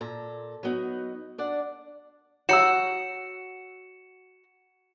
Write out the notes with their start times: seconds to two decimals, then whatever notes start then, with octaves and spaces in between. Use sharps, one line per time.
0.01 A#2 A4 A#5
0.63 F#3 B3 D#4
1.38 D4 D5 F#5
2.49 F#4 C#5 A#5 E6 C#7 E7